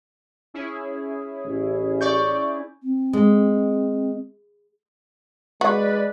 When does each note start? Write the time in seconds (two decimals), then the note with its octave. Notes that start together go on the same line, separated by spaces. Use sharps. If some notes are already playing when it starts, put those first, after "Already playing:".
0.54 C#4 E4 G#4
1.44 A1
2.01 D5 C#6 G6
2.83 C4
3.13 G#3
5.61 G#3 F#4 B4 D5